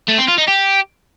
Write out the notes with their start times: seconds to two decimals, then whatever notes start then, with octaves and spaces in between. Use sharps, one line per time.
0.09 A3
0.18 C4
0.28 F4
0.38 D#4
0.48 G4